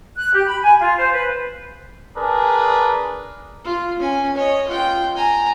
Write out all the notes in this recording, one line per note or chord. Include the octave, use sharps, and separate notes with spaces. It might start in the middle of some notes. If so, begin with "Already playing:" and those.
F#6
G4
B5
G#5
F4
C5
B4
D4 G#4 A#4 B4
F4
C#4 G#5
C#5 D#5
F4 G5
G#5 A#5